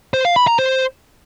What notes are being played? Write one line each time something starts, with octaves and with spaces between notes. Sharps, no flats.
C5
F5
B5
A#5
C5